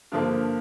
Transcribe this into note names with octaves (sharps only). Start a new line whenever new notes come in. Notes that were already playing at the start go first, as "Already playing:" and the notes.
G2 D3 F3 A#3